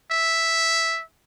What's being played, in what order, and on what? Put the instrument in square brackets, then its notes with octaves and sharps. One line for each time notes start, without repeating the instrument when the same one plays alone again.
[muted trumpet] E5